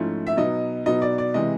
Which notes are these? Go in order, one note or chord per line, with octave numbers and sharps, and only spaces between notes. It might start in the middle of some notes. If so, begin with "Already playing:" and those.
Already playing: G#2 F3 A3 C#4 E4
E5
B2 F#3 B3 D#4 D#5
B2 F#3 B3 D#4 D#5
D5
D5
C3 E3 G#3 D#5